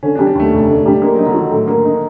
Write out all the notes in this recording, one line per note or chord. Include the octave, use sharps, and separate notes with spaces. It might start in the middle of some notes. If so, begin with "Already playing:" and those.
D3 C#4
D4
G3
D4
D#2 A3
F1
D3
G3
G#3 A#3
F#3
D#4
D3
D#3 F#3
A2
A#3
D#4